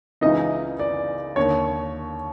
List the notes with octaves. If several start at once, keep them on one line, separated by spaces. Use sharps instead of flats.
C#2 C#3 E3 D#4 D#5
D5
D#2 D3 C#5